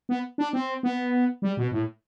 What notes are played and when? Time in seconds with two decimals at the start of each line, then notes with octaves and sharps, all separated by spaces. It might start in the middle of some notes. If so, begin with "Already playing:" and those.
0.09 B3
0.38 D4
0.53 C4
0.83 B3
1.42 G3
1.57 B2
1.72 A2